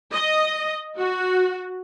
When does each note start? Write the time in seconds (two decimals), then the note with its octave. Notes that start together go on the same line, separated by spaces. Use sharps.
0.13 D#5
0.98 F#4